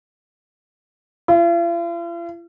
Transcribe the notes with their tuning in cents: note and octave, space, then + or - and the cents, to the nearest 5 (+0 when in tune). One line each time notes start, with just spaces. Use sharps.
F4 -45